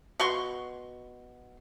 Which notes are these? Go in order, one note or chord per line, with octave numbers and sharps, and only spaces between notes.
B2 F#4 C6 C#6